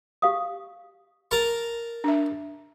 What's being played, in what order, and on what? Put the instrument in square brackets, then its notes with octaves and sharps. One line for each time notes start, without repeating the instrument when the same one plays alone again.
[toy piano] G4 F5 D#6
[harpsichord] A#4 A5 A#5
[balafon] D4 E5